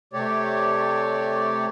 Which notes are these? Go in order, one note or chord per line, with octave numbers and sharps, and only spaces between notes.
C3 A3 G4 C#5 D5